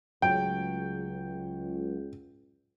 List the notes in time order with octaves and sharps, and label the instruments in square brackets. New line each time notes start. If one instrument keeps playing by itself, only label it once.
[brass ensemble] C#2 [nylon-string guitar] F#3 A3 [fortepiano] G5